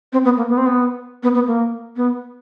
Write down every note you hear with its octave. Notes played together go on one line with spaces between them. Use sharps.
C4
B3
A#3
B3
C4
B3
B3
B3
A#3
B3